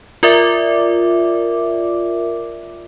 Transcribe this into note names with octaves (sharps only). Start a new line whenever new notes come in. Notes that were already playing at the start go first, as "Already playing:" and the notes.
F4 A#4 D5 E5 D6